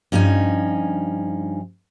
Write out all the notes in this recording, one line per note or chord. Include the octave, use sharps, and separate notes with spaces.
G2 F3 C#4 D#4 G#5